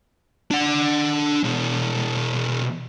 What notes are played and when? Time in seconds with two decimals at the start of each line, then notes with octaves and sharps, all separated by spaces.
0.51 D4 F#5
1.44 B2 G#3